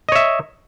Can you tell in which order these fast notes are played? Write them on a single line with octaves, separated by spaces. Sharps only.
D#5 C#5 E5